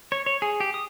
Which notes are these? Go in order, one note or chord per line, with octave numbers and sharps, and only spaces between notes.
C#5
C#5
G#4
G4
D#6